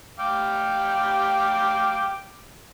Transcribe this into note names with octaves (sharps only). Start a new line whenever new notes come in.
F5 G5 D6